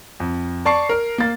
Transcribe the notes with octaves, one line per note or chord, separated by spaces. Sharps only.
F2
D5 A5 C#6 C7
A#4
A#3 A6